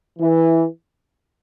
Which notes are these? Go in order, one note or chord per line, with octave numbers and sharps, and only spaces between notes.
E3